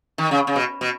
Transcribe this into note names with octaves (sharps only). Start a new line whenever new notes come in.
D#3
C#3
C#3
B2
B2